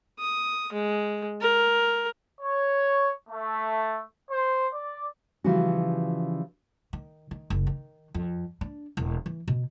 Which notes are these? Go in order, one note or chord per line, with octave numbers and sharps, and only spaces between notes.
D#6
G#3
A#4
C#5
A3
C5
D5
C#3 E3 F3 G3 B3 F#4
D#3
D#3
F#1
D#3
F2
D4
E1
E3
B2